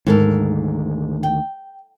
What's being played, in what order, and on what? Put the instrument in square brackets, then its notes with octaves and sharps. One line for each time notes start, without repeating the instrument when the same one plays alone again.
[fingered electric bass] D2 D#3 [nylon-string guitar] G#2 A4 A#4
[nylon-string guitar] G5